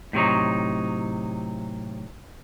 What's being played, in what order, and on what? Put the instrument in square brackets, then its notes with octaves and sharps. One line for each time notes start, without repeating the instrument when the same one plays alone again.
[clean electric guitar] A2 C3 F#3 D#4